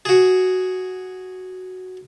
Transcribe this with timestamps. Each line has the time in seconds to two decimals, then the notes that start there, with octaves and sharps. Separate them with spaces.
0.05 F#4 G#4